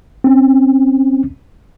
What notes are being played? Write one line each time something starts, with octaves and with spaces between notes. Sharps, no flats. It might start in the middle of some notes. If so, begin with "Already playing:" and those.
C4 C#4